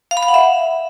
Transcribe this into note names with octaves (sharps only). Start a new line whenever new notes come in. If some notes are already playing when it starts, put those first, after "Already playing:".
F5
B5
F5
F#5
E5